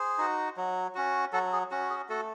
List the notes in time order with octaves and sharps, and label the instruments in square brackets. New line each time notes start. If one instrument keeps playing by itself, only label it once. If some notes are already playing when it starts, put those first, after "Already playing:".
Already playing: [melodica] G#4 C5
D#4 F#4
F#3
C#4 F#4
F#3 F#4 A4
G#4
C#4 F#4
G#4
A3 F#4 A4